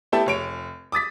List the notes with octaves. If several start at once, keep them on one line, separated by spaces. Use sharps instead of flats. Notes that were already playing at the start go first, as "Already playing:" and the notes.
A3 B3 E4 G4 E5 A5
F1 C#5 D7
D6 D#6 A6 B6